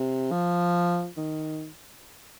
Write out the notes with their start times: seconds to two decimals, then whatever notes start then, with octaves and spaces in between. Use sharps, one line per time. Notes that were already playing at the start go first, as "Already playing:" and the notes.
Already playing: C3
0.31 F3
1.17 D#3